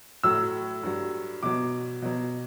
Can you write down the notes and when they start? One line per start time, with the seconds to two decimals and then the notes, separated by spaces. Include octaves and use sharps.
0.24 A2 F#3 E6
0.83 G2 F#3
1.43 B2 F#3 D6
2.02 B2 F#3